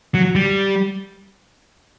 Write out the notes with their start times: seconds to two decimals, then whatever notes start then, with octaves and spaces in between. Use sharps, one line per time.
0.15 F#3
0.36 G3